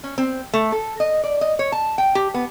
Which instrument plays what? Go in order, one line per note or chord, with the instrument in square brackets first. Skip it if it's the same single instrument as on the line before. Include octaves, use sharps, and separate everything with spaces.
[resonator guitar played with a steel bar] C#4
C4
A3
A4
D#5
D5
D#5
C#5
A5
G5
G4
B3